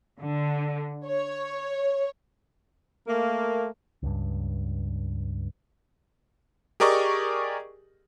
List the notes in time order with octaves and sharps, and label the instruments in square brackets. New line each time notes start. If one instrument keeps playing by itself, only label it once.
[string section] D3
C#5
[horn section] A3 A#3
[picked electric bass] C#2 G2
[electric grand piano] G4 G#4 A#4 D5 D#5 C#6